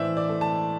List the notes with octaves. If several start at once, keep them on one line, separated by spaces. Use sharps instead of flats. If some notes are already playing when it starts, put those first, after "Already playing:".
Already playing: A2 E3 C5 D5 E5
D5
A3
A5